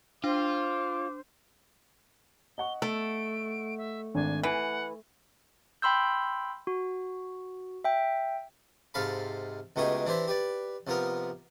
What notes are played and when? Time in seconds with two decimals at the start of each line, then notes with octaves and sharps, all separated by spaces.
0.24 D4 F4 C5 D6
2.58 D#5 F#5 C#6 G7
2.82 A3 A4 D7
3.78 E5
4.15 G#1 D4 G#5
4.43 E3 F#5 G#5
5.82 G5 B5 C6 E6 G6
6.67 F#4
7.84 E5 G5
8.94 G#2 C3 A4 F5 B5
9.76 C#2 B2 A3 D#4 G4 G#4
10.06 E3 D4 E4 G4 C5 E5
10.28 G4 B4 D5
10.87 C2 F3 B3 A#4 D#6